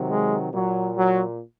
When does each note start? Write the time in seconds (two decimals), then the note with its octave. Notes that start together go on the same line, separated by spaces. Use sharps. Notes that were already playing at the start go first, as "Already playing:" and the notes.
Already playing: C3 D#3 F#3
0.09 G#3
0.52 A#2 F#3
0.96 F#3